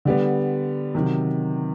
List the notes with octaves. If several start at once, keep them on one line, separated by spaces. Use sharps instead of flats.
D3 G3 B3
C3 D#3 F#3